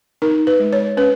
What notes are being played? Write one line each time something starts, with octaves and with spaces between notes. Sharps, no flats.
D#4 A#4
B4
G#3
C#5
C#4 B4